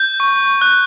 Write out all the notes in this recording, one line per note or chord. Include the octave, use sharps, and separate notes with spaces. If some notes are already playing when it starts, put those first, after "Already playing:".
Already playing: G6
C#6
F#6